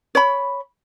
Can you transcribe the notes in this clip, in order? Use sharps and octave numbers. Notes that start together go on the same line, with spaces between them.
C#5 B5